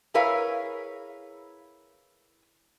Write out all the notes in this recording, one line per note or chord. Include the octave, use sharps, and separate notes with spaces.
E4 G#4 A#4 B4 C#5 F5